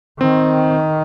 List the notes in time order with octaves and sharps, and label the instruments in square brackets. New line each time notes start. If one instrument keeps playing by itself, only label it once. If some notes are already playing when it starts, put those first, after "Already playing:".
[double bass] D#3 [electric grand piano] C4